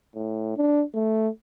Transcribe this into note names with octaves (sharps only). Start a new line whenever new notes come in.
A2
D4
A3